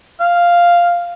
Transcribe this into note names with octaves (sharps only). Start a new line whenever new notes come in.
F5